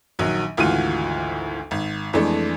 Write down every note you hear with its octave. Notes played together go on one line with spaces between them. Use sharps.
A#1 D#3 F#3
G#1 D2 E3 F4 F#4 D#7
G#1
F2 E3 G#3 A3 D4